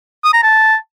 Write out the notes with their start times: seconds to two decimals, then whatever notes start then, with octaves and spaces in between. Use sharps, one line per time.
0.24 D#6
0.33 A#5
0.43 A5